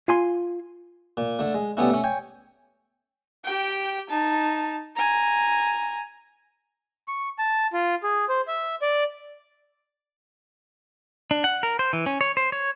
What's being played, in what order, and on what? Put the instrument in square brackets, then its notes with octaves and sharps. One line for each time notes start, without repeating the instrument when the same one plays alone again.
[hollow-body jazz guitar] F4 G#5 C6
[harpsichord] A#2
D3 A3
G#3
G3 A3 B3 C#4 E4
A3 C#4
C#5 G5 G#5
[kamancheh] G4 G5
D#4 A5
G#5 A#5
[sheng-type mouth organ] C#6
A5
F4
G#4
C5
E5
D5
[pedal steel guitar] D4
F#5
A#4
C5
E3
C#4
C#5
C5
C#5